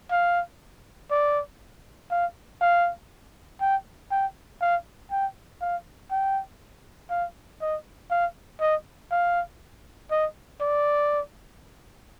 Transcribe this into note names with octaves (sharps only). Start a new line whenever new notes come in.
F5
D5
F5
F5
G5
G5
F5
G5
F5
G5
F5
D#5
F5
D#5
F5
D#5
D5